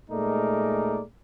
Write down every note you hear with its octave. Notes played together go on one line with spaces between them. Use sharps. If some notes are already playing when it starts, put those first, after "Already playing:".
A#2 G#3 A3 D#4 A#4 D5